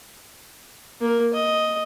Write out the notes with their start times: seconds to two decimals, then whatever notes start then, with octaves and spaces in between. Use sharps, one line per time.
1.01 A#3 A#4
1.34 D#5